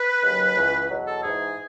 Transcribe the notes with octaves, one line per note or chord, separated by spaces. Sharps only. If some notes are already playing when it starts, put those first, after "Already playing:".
Already playing: B4
D#2 C#3 F#3
C#2 C#3 E3
E2 B2 F#3
A4
G#2 E3 G#4